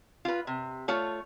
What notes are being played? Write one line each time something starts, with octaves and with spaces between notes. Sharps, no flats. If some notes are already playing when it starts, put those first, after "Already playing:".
F4 B4
C3
A3 F4 C#5